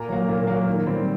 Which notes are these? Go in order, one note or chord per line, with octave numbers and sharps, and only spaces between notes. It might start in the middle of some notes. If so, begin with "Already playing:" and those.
Already playing: A#2 A#5
F#3 A#3
A#2
F#3 A#3
D#3
G3 C4